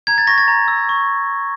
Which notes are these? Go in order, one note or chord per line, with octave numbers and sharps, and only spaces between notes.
A#5 G#6
A6
C#6 A#6
A6
A#5
E6
C#6